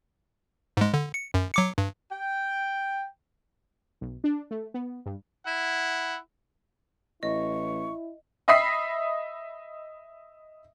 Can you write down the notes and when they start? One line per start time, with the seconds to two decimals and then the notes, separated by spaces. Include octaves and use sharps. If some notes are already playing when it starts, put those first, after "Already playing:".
0.77 G#2 G#3
0.94 D3
1.14 C#7
1.34 F#2
1.54 F#3 D6 C#7
1.78 G2
2.12 G5
4.01 B1
4.24 D4
4.51 A3
4.74 B3
5.06 G2
5.47 E4 F#5
7.23 A1 E4 D#5 C#6
8.48 D#5 E5 B5 D#6 B6 C7